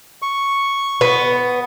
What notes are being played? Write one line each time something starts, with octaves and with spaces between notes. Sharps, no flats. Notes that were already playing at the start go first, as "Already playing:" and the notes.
C#6
B3